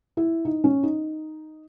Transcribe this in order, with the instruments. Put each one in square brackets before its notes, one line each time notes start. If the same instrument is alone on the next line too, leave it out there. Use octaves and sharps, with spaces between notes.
[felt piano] E4
D#4
C#4
D#4